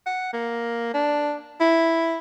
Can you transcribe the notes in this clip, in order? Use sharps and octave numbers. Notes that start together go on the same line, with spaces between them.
F#5
A#3
D4
E4